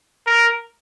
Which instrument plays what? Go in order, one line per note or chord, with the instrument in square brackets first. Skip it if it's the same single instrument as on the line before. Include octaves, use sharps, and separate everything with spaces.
[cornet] A#4